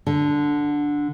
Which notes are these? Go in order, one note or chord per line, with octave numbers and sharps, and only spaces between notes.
D3